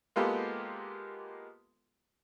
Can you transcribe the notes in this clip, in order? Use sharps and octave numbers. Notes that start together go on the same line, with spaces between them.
G#3 A#3 B3 F4 G4 A4